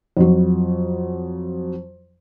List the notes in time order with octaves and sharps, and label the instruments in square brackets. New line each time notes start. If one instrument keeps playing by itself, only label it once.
[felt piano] F2 F#3